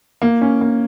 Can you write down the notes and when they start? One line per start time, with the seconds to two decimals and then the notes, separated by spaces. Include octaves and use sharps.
0.22 A#3
0.41 C#4
0.61 A#3